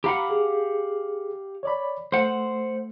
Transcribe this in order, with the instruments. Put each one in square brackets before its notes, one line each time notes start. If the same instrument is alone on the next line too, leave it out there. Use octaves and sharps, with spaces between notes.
[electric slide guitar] G4 F5 F#5 [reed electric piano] A#5 B5
[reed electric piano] G#4
C#5 D5 B5
[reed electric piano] A3 [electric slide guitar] C5 F#5